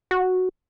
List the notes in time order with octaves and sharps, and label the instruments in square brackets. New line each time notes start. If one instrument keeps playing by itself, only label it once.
[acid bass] F#4